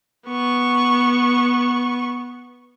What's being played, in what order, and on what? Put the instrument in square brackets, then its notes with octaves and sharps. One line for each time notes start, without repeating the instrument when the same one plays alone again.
[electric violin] B3 C#6